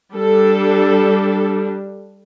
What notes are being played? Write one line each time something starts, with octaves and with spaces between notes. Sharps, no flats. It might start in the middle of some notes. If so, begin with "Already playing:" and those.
G3 D4 A4